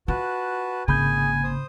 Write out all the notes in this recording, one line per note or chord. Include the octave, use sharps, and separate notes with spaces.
F4 F#4 B4 A5
G#1 C#3 A#3 G#4 G#5 B5 G6
C5 D#6